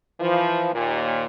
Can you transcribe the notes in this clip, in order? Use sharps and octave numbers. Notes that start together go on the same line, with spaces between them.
E3 F3
D#2 A#2